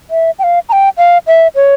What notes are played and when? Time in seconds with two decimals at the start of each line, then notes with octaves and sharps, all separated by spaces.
0.10 E5
0.39 G5
0.44 F5
0.69 A#5
0.73 G5
0.98 F5
1.27 E5
1.56 C#5